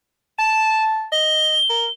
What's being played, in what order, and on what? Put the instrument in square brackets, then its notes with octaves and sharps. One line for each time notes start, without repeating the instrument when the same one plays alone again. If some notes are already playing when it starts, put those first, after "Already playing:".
[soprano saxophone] A5 [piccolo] E7
[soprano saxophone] D#5 [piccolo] G7
[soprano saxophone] A#4